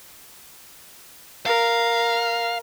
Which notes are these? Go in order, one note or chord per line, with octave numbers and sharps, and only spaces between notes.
A#4 F5